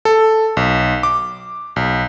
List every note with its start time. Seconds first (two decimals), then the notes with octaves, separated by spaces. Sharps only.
0.05 A4
0.57 B1
1.03 D6
1.76 B1